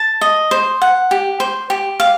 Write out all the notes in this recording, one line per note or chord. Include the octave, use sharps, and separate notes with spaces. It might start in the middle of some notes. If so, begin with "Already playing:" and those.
Already playing: A5
D#5
C5
F#5
G4
C5
G4
F5